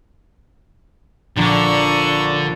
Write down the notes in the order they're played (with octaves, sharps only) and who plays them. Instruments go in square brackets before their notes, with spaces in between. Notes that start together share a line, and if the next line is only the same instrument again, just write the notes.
[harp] A#1 [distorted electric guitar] D3 [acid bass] D4 [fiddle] A#5 C#6